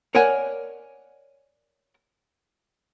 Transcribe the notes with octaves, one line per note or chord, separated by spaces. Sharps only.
A#4 C#5 D5 F#5 G#5